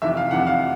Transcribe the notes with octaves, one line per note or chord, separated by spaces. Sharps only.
F2 C3 E3 E5
F5
F2 C3 E3 F#5
F5